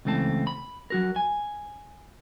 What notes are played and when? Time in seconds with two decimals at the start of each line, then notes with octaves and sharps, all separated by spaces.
0.05 C#2 E3 A3 C4 A5
0.47 B5
0.90 F#3 F#4 A#4
1.16 G#5